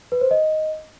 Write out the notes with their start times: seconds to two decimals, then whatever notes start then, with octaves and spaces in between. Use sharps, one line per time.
0.12 B4
0.21 C5
0.31 D#5